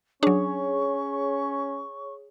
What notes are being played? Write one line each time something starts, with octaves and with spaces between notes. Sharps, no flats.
F#3 C#4 D4 G#4 C#5 C#6